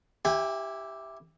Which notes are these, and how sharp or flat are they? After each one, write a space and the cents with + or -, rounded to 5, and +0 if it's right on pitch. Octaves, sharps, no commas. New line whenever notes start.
E4 +0 G4 +0 G#5 -40